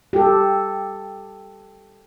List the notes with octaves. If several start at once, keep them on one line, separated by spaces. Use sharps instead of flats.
G4 A4